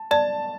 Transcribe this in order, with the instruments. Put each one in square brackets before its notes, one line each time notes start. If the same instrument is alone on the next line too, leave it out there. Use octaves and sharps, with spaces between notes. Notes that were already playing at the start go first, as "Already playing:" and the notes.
Already playing: [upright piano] A5
[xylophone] D5 [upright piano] A5